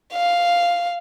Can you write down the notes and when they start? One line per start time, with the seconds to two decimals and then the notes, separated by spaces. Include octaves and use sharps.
0.13 F5